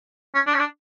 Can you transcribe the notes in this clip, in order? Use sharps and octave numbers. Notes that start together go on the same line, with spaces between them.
C#4
D4
C#4
D4